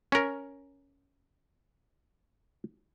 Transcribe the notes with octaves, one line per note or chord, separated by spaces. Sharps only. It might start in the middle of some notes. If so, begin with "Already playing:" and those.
C#4 A#4